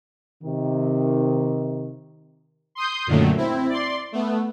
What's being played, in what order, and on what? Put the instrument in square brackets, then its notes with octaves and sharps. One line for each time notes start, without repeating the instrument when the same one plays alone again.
[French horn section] C3 D#3
[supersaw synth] C6 D#6 G6
F#2 A#2 D3 D#3 F#3 A3
C4 E4
D5 C6
A3 B3